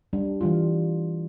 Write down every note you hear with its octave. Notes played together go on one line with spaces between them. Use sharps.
G3 D4
E3 G3 F4